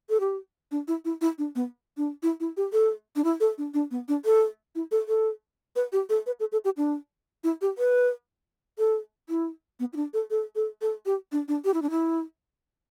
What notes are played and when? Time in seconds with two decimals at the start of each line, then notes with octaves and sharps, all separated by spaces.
0.09 A4
0.20 G4
0.71 D4
0.88 E4
1.05 E4
1.21 E4
1.38 D4
1.55 B3
1.97 D4
2.23 E4
2.40 E4
2.57 G4
2.73 A4
3.16 D4
3.24 E4
3.40 A4
3.58 D4
3.74 D4
3.91 B3
4.08 D4
4.25 A4
4.75 E4
4.91 A4
5.08 A4
5.76 B4
5.92 G4
6.09 A4
6.26 B4
6.40 A4
6.52 A4
6.65 G4
6.77 D4
7.44 E4
7.61 G4
7.78 B4
8.78 A4
9.29 E4
9.80 B3
9.93 E4
9.96 D4
10.13 A4
10.30 A4
10.56 A4
10.81 A4
11.06 G4
11.32 D4
11.48 D4
11.64 G4
11.74 E4
11.82 D4
11.90 E4